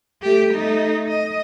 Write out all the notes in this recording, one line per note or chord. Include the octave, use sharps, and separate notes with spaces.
A3 G4
A3 D#4
D#5